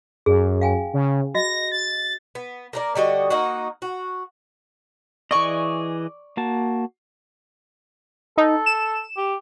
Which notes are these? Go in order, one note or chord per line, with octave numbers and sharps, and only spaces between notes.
F#2 G#4
F5 G5 G#5
C#3
F#4 D#5 A#6
A6
B3
A#3 A#4 D5
D3 G3 F#4 D#5
A#3 D#4 F#4
F#4
E3 G#4 D5 D#5 C#6
A#3 F#4 A5
D#4 A4
E7
G4